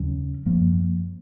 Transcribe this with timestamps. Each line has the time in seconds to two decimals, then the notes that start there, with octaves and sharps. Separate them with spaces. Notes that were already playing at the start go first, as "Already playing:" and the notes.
Already playing: D#2 C#3 F#3 C#4
0.46 F#2 F3 A#3